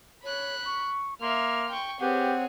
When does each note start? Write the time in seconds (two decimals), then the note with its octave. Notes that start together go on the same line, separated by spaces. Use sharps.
0.24 C#5 B5 F#6
0.66 C#6
1.21 A#3 E5 C6 F6
1.70 G5 C#6
2.01 C4 G4 G#4 B4 C#5 F#5